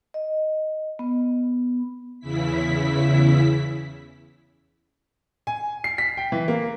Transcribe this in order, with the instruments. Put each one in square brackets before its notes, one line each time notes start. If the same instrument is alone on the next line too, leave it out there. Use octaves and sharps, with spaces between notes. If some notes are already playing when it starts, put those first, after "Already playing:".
[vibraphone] D#5
B3
[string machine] E2 C#3 E4 B6
[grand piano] G#5
C7
B6
G5
E3
A#3